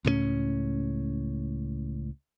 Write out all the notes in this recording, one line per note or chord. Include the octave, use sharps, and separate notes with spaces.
C#2 A2 G#3 C#4